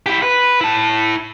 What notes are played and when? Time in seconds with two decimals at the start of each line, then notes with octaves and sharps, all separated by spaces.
0.06 E4 G4
0.22 B4
0.61 E4 A5